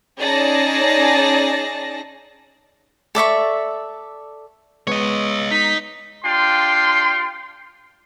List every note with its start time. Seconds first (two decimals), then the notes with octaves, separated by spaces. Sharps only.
0.18 C#4 D#4 G#4 D5 A5 A#6
3.15 A4 D5 E5 C#6
4.87 G#3 B3 C#5 D#5
5.51 D#4 B6
6.25 D4 F4 G4 G5 C6